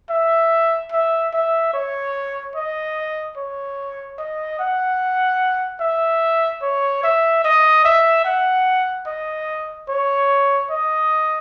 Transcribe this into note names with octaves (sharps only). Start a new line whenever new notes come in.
E5
E5
E5
C#5
D#5
C#5
D#5
F#5
E5
C#5
E5
D#5
E5
F#5
D#5
C#5
D#5